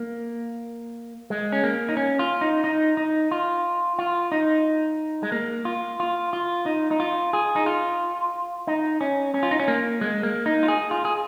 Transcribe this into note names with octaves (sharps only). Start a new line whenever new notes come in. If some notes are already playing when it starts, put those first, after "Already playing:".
Already playing: A#3
G#3
C#4
A#3
D#4
C#4
F4
D#4
D#4
D#4
F4
F4
D#4
G#3
A#3
F4
F4
F4
D#4
D#4
F4
G#4
D#4
F4
D#4
C#4
C#4
F4
D#4
C#4
A#3
G#3
A#3
D#4
F4
G#4
F4
G#4